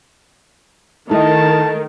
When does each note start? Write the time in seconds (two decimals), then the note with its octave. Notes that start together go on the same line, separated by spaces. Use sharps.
1.11 D#3 A3 E4 D#5 A5